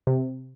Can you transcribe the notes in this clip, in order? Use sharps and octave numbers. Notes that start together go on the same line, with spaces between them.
C3